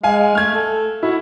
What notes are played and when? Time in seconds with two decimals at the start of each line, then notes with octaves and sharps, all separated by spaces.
0.03 G#3 F5 G#5
0.35 A3 F6 G#6
0.54 A4
1.03 E4 F#4